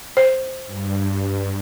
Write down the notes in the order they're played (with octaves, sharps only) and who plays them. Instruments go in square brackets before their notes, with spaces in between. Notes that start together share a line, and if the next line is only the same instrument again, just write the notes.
[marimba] C5
[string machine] G2